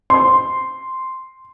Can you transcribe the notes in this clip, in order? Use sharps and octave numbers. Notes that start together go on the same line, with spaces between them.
C6